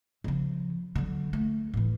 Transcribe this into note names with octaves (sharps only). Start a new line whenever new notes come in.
C#3 F3
D3 F#3
A3
A2 E3